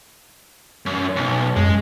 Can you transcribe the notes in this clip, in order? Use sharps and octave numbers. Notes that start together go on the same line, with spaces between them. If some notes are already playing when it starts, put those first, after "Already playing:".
F#2
B1
F#2 G#3